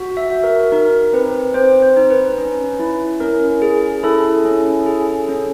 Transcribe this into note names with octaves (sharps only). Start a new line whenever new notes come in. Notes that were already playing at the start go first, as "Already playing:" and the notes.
Already playing: F#4
E5
F#4
A#4
D#4 A#4
C4 B4
C4 C5
C5
D#4
B4
C#4
E4
C#4 A#4
G#4
E4 A4
C#4
G#4
C#4